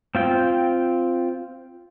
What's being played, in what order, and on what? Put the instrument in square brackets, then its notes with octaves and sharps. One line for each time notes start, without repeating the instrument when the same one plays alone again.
[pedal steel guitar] C4 F4 G5